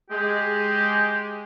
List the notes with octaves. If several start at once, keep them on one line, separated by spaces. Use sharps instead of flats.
G#3 G4